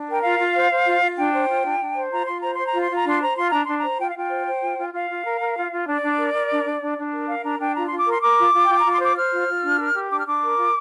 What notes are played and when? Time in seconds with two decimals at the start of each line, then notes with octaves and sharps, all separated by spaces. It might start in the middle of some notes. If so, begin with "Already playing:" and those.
Already playing: D4
0.08 A#4 G5
0.23 F4 F5
0.40 F4
0.54 C5
0.71 C5
0.86 F4
1.02 F4
1.17 D4 G5
1.33 C5
1.48 F4
1.65 D4
1.80 D4
1.95 C5
2.11 F4 A#5
2.26 F4 C6
2.40 C5 A#5
2.53 C6
2.59 C5
2.67 A#5
2.74 F4
2.81 C6
2.90 F4 A#5
3.06 D4 C6
3.21 C5 A#5
3.36 F4 C6
3.50 D4 A#5
3.65 D4 C6
3.78 A#5
3.84 C5
3.99 F4 G5
4.08 F5
4.15 F4 G5
4.30 C5
4.46 C5
4.62 F4
4.78 F4
4.93 F4 F5
5.09 F4
5.24 A#4
5.40 A#4
5.57 F4
5.72 F4
5.87 D4 D5
6.02 D4
6.18 A#4
6.34 A#4
6.50 D4
6.65 D4
6.81 D4
6.98 D4
7.13 A#4
7.28 A#4 F5
7.44 D4 A#5
7.59 D4 G5
7.75 F4 A#5
7.87 F4 C6
7.98 D6
8.07 A#4 C6
8.22 A#4 D6
8.38 F4
8.54 F4
8.65 F4 G5
8.79 A#5
8.85 F4
8.91 C6
9.01 C5 D6
9.16 C5 F6
9.32 F4
9.48 F4
9.63 D4
9.79 A#4
9.94 G4
10.10 D4 D6
10.18 F6
10.25 D4 D6
10.42 A#4
10.57 F4